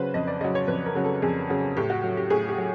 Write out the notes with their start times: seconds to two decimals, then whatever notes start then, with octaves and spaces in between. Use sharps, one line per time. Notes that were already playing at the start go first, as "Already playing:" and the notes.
Already playing: C#3 F#3 B4 C5
0.14 F2 D#5
0.27 D5
0.41 C#3 F#3 D#5
0.55 C#5
0.68 F2 B4
0.86 A#4
0.95 C#3 F#3
1.04 A4
1.22 F2 G#4
1.49 C#3 F#3
1.77 A2 G4
1.90 F#4
2.03 F#3
2.17 G4
2.30 A2 G#4
2.48 G4
2.58 F#3